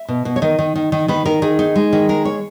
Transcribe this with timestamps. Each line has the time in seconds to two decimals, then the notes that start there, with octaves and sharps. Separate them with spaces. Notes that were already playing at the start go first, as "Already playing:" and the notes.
Already playing: E5
0.08 B2
0.25 B2
0.36 C#5
0.42 D#3 D#5
0.59 D#3
0.76 D#3
0.92 D#3
1.08 D#3 B4
1.25 D#3 A#4
1.42 D#3 G#4
1.59 D#4
1.76 G#3
1.93 D#3
2.09 G#3 A#4
2.25 C#5